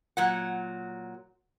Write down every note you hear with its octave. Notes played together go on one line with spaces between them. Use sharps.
A#2 F#3 F#5